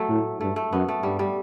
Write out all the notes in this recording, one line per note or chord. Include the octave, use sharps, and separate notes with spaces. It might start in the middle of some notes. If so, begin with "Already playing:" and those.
Already playing: F#3 A3
A2
G2 A3
A3
F#2 B3
A3
G2 G3
G3